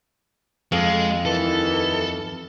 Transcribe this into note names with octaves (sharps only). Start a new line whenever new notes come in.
F2 G#3
D#2 D#3 E3 A4